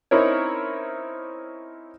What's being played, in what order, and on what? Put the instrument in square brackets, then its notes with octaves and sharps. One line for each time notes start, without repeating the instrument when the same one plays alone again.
[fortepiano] C4 C#4 D#4 E4 A#4 C#5